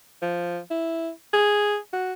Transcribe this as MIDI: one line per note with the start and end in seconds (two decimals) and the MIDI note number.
0.22 0.60 53
0.71 1.11 64
1.33 1.78 68
1.93 2.13 66